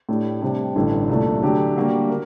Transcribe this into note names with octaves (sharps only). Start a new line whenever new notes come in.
A2 A3 D4 G4
C3 G3 D4
A1 G2 D3 A3
C2 A#2 A3 D4
D3 F#3 A3 D4 G4
D3 G3 A#3 F#4
A#4